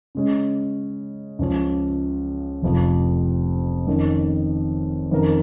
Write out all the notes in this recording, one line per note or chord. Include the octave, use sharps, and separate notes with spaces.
C#3 G#3 C#4
C#2 C#3 F3 C#4
F1 F2 F3
F2 D#3 C#4
F2 D#3 C#4 A#4